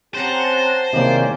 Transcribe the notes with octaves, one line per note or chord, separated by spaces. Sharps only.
C4 C#4 G4 C5 F#5 A5 A#5
E2 C3 D#3 A#3 C#4 D5